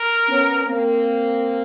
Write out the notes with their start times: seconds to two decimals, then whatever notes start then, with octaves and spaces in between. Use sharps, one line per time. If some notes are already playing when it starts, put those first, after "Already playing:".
Already playing: A#4
0.28 B3 C#4
0.64 A#3 C4